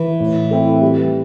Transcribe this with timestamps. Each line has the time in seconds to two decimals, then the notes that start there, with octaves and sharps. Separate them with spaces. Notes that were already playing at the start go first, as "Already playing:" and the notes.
Already playing: E3
0.20 A2
0.51 A3 C4 E4
0.82 G3